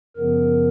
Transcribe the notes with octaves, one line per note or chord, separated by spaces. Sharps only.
F#2 C#3 F3 B3 A#4